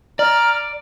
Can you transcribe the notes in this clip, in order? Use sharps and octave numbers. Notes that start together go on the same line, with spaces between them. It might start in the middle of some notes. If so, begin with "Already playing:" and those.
D5 A#5 F6